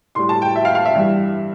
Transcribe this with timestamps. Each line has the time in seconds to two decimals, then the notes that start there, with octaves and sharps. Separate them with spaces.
0.15 A2 G3 C6
0.29 A5
0.42 G5
0.55 E5
0.65 F5
0.75 F5
0.85 E5
0.95 G2 E3 G3